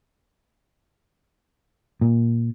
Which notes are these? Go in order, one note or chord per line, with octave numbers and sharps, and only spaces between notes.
A#2